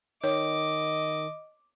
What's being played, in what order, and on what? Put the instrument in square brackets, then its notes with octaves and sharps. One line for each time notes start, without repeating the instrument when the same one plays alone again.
[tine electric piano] D#3 [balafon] C#5 [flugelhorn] D#5 [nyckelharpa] D6